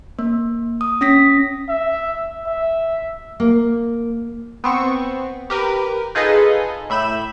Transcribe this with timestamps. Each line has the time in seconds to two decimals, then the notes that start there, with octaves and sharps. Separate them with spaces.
0.19 A#3
0.81 D#6
1.01 C#4 D#6 A#6 B6
1.69 E5
2.46 E5
3.40 A#3
4.64 B3 C4 C#6
5.50 G4 A#4 B4
6.15 D#4 F4 G#4 A4 B4 D#5
6.90 A2 E5 B5 G6 E7